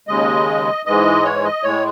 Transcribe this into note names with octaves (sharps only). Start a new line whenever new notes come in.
D#2 C#3 G#3 D#5
G#2 E3 G#3 D#5
C#5
D#5
A2 G#3 C#5